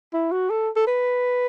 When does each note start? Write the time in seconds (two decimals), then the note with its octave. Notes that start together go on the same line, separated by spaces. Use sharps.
0.13 E4
0.32 F#4
0.50 A4
0.76 A4
0.87 B4